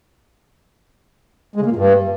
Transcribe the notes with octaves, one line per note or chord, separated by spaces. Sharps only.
G#3
C#3
A#3
A#2
G2